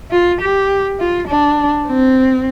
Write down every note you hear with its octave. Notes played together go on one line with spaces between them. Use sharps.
F4
G4
F4
D4
C4